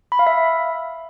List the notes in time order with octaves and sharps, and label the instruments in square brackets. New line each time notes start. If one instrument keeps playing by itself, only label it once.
[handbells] B5
F5
E5